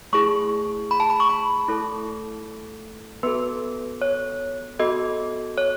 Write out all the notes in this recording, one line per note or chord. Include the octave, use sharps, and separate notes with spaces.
A3 E4 G#4 C#6
B5
A5
B5
C#6
B5
A3 E4 A4
B3 F#4 A4 B4
C#5
B3 F#4 A4 D#5
C#5